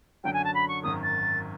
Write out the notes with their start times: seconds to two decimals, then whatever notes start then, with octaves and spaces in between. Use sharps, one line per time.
0.24 F#2 D3 F#3 G5
0.33 G#5
0.44 A5
0.54 B5
0.68 C#6
0.83 G#1 F#2 D#3 D#6
1.03 A6